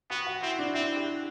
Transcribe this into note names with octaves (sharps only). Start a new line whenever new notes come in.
B3 F#4
F#4
C4 E4
D4
C4 E4
G4